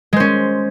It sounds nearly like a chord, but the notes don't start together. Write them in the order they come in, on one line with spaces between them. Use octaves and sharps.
G#3 C5 C#4